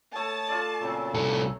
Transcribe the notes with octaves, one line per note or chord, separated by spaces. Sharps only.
A3 C#5 A5 D#6
F4 A4 D5
A#2 C#3 F#3 C4 C#6
C2 A4